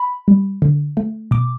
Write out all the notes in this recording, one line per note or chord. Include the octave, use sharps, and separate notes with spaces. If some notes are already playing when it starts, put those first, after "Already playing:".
Already playing: B5
G3
D3
A3
B2 D6